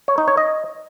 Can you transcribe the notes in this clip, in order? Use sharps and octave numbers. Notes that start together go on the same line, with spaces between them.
C#5
D#4
C#5
D#5